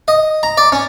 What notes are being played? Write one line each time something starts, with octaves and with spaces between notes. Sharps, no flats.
D#5
A#5
D5
C#4